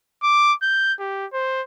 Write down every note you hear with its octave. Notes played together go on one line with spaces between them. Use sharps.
D6
G6
G4
C5